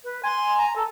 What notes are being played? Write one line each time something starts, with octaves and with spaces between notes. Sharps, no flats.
B4
G#5 C6
A#5
A4